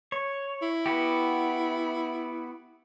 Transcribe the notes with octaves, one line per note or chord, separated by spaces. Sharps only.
C#5
E4
B3 F#4 G4